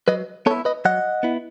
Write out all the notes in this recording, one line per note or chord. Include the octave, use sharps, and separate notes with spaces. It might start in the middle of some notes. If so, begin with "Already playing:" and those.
F#3 B4 D#5
B3 E4 A4 C#5
B4 D#5
F#3 D#5 F#5
B3 E4